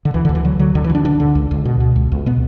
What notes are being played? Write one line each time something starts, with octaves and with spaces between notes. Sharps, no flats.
D3
D2 E3
D3
D2
E3
D3 F#3
D3 F#3
D2 D3
E3
D2
D4
D3 D4
D3
C#2
C#2
B2
B2
C#2
C#2
B2 B3